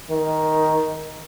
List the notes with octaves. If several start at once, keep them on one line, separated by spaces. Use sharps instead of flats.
D#3